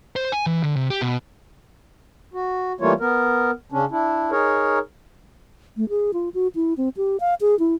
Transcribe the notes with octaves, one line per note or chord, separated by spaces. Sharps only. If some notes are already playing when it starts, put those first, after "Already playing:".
C5
G#5
E3
D3
C3
G4
B2
F#4
E3 G3 A3 A#3 F4 C#5
B3 A#4
C#3 C#4 D4
D4 E4
D#4 G#4 A#4 C#5
A3
G#4
F4
F#4
E4
C4
G4
F5
G#4
E4